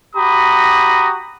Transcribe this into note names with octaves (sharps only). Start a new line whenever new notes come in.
F#4 G4 A#5 B5 D#6